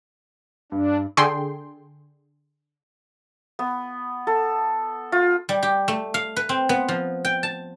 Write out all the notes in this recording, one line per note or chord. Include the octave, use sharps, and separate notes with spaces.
G2 D4
D3 G#4 A4 G5 C6
B3
A4
F4
G3
G4
A3
F5
B4
C4
B3
F3
G5
A5